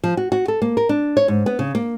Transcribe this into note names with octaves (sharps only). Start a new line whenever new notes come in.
F3
F#4
F#4
A4
A#3
A#4
D4
C#5
G#2
B3
C#3
A#3